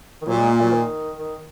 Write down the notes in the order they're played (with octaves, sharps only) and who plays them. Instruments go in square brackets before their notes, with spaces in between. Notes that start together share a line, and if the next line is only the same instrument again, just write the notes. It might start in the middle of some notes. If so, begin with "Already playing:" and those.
[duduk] D#3
[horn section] A#2 [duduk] F#3
[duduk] G#3
A#3
F#3
D#3
D#3